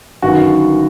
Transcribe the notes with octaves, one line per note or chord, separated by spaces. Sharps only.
G1 F#2 D#3 F#4